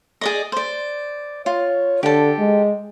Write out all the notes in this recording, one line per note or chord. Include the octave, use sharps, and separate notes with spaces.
G#4 D5 D#5
C5 D5
F4 C#5
D3 G4 A4
G#3